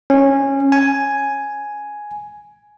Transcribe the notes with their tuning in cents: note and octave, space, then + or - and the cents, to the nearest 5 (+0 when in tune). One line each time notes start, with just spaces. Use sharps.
C#4 -15
G#5 +5